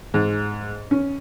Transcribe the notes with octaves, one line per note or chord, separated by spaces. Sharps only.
G#2
C#4